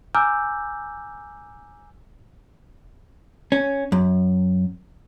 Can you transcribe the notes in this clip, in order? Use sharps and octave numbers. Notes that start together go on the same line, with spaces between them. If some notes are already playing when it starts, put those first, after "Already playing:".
G#5 A#5 D6 E6 F6 G6
C#4
F#2